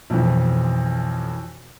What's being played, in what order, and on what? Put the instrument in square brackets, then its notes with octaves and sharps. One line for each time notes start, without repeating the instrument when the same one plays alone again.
[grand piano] B1 F2 E3 F3